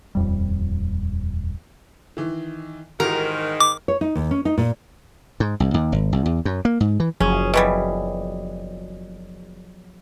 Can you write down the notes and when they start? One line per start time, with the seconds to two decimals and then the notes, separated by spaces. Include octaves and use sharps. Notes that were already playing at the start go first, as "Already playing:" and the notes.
0.15 D#1 F2 G3
2.17 D#3 E3
3.00 G#2 D#3 E3 F#4 G4 A#4
3.60 D6
3.88 C#5
4.01 D#4
4.15 D#2
4.31 C#4
4.45 D#4
4.58 A#2
5.40 G#2
5.60 C2
5.74 D#2
5.92 G#1
6.12 C2
6.26 E2
6.45 F#2
6.65 A#3
6.80 G#2
7.00 E3
7.20 F#1 F3 F#3 C#4 G#4
7.54 B2 E3 G3